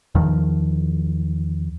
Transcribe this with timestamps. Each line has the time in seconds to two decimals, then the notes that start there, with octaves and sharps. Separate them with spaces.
0.15 E2 D#3 F3